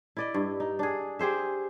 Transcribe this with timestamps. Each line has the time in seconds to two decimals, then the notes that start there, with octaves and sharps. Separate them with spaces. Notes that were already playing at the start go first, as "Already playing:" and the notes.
0.17 E4 D5 D#5
0.34 G2
0.60 D#4
0.79 D4 G#4
1.19 G4 G#4 C5 E5